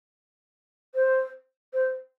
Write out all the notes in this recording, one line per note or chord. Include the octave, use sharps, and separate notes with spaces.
C5
C5